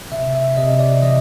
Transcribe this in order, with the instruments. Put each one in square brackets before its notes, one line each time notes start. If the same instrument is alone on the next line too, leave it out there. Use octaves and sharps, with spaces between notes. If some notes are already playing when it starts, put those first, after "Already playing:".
[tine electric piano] C3 E5
E5
C3 D#5
D5
E3 D#5